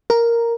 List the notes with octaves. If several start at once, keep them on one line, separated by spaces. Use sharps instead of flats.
A#4